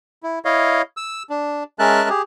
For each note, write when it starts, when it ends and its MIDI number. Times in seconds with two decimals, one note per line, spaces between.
0.23 0.39 64
0.45 0.82 64
0.45 0.82 73
0.45 0.82 75
0.45 0.82 77
0.97 1.23 88
1.30 1.63 62
1.79 2.09 56
1.79 2.09 61
1.79 2.09 70
1.79 2.09 76
1.79 2.09 81
1.79 2.09 90
2.09 2.22 67
2.09 2.22 68